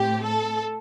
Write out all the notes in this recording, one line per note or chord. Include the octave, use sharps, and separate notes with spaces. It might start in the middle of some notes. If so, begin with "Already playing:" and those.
Already playing: A2 A3 C4 G4
A4